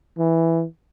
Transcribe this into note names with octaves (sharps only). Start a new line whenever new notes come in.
E3